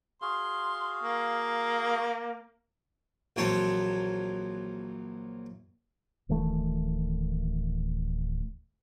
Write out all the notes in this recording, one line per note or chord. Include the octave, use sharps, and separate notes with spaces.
F#4 G#4 F5 C6
A#3
A#1 E3 F#3 C4 C#5 A5
D1 D#3 E3 A3